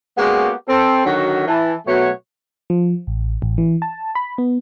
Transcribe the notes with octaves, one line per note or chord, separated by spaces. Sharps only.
G#3 A#3 B3 C#4 F#4 G4
C4 A4
D3 D#3 F#3 F#4
E3 A5
B2 F#3 A3 F#4 C#5 F#5
F3
A1
A1
E3
A5
B5
B3